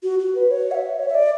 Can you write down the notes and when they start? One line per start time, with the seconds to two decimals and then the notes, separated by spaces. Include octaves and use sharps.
0.03 F#4
0.19 F#4
0.35 B4
0.51 C#5
0.71 F#5
0.75 E5
0.99 C#5
1.08 E5
1.15 D5